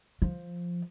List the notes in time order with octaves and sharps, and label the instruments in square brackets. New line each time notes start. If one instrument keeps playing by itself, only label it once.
[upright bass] F3